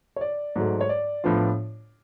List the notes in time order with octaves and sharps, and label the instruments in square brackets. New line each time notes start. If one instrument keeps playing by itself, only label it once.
[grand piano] C#5
D5
G#2 F#3 A3
C#5
D5
A2 F3 B3 D4 F4